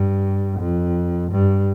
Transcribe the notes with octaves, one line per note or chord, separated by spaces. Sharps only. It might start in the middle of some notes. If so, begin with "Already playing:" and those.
Already playing: G2
F2
G2